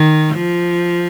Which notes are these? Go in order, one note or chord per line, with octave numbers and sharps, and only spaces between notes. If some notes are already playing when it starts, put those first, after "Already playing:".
Already playing: D#3
F3